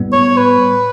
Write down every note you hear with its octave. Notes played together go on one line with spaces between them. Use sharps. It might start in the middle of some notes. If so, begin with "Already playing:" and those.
Already playing: A2 G3 B3
C#5
B4